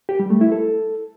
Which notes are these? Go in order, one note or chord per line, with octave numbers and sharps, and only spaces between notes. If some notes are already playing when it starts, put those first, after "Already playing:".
G4
G3
A3
E4
A4